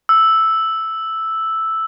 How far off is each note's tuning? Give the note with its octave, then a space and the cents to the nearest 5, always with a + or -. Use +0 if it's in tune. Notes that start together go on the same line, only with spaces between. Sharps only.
E6 -5